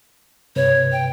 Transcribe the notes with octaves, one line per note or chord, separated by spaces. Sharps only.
G2 C3 B4 C#5
G5